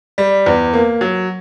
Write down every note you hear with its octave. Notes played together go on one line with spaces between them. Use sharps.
G3
E2
A#3
F#3